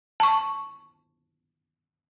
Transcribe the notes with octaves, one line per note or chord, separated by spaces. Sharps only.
A5 C#6